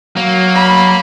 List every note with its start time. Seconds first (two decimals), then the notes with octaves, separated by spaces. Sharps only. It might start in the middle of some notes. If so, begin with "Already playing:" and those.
0.17 F#3 A#3
0.55 B5